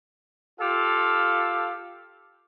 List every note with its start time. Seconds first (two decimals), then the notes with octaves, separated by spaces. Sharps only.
0.60 F4 G4 A4 F5